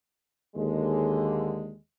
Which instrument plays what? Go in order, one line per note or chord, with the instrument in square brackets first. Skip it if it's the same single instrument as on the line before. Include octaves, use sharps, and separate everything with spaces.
[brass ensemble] D#2 D3 G#3